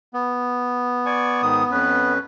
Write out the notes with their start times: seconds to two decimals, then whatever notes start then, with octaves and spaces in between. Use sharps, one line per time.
0.14 B3
1.06 D5 G#5 C#6
1.42 G#2 D#3 D#6
1.71 F2 C#4 B4